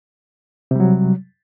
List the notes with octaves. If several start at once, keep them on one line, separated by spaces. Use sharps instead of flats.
C3 F#3 G3